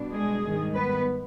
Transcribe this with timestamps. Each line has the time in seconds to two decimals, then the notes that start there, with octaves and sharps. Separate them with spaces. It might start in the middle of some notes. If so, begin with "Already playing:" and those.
Already playing: B2 G3 D4
0.12 G#3 G#4
0.44 G#2 D#3 G3
0.75 B3 B4